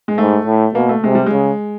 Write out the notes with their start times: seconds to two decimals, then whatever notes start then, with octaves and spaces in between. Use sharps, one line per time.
0.08 G#3
0.18 G#2 A3
0.46 A2
0.75 B2 A#3
0.89 A3
1.04 C3 G#3
1.15 G3
1.26 C#3 G#3